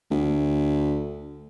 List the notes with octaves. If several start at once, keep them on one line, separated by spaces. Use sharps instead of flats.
D2